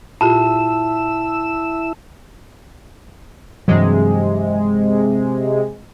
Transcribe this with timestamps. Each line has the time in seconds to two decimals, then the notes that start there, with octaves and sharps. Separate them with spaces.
0.21 A#2 E4 F4 G4 A5 E6
3.68 G2 C3 E3 F#3 G#3